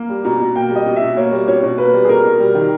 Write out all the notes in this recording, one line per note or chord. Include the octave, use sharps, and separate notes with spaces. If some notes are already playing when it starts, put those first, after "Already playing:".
Already playing: A#3
G3
B2 A#5
B2
A#3 G5
G3
D#5
B2
E5
B2
A#3 C#5
G3
B2 C#5
B2
A#3 B4
G3
G#4
B2 A#4
B2
G3
D#3